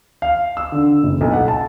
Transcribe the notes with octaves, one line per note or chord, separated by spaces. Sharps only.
F5
E6
D3
F#1
B1
F#5
A5